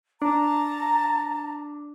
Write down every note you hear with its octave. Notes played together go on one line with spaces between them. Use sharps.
D4 A5 A#5